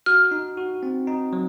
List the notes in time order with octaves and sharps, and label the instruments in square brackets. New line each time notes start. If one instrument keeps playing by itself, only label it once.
[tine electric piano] F#4 [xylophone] F6
[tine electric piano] D#4
F#4
C4
D#4
F#3